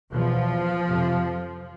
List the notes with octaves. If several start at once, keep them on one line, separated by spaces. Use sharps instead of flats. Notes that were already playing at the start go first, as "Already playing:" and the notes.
E2 B2 F3
F2 C3